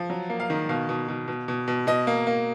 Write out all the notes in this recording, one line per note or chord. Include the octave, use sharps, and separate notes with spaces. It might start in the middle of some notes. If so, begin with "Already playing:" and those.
Already playing: F3
F#3
A#3
F5
D#3
B2 F5
B2
B2
B2
B2
B2
B2 D#5
A#3
A#3